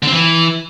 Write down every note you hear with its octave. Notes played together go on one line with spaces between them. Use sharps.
D3
C4
E3